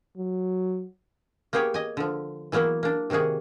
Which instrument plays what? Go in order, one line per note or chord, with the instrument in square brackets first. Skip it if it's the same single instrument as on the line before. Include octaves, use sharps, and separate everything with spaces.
[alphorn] F#3
[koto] A#3 B3 G4 G#4 C#5
D#5 G#5
D3 F3
E3 F#3 A#3 B3 E4
A#3 D4
C3 D#3 A#3 F#4 G#4